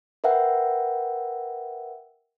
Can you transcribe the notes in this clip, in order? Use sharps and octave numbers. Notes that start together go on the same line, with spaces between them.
A#4 B4 E5 F#5 G5